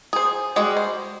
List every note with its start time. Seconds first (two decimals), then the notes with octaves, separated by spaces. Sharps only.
0.13 G#4 C5
0.56 G3 G#3 F#4
0.77 C5